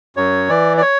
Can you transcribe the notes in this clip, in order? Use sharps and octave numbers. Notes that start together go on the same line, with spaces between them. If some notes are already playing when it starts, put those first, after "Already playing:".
F#2 C#5
E3 D5
D5
C#5